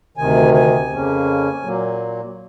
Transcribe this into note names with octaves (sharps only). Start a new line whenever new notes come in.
D2 C3 D#3 G#5
G#5
F2 C#3 F3 A#3 C#4
A#2 F#3 A#3